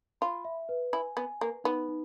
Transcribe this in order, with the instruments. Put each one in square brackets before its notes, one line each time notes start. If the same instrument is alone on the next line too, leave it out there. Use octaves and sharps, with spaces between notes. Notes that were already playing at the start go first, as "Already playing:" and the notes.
[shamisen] F4 [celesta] B5
[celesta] E5
B4
[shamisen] E4 [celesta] G#5
[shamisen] B3 [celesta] G#5
[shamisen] A#3 [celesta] B4
[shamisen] B3 [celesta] D#4
[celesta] D#4